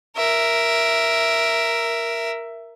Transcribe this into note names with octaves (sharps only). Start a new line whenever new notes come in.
A#4 E5